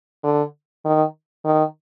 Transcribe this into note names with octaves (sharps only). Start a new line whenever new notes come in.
D3
D#3
D#3